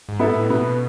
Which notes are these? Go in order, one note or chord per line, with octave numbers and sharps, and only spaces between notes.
G#2
B3 E4 A4
A2
B2 B3